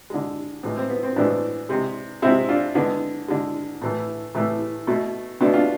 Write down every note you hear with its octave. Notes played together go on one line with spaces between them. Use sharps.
D3 G#3
A2 E3 G#3
C4
B3
C4
A2 E3 G#3 B3 D4
C3 G#3
C3 G#3 C4 E4
D4 F4
D3 G#3 B3
D3 G#3
A2 E3 A3
A2 E3 A3
B2 A3
B2 A3 B3 D4
D4 F4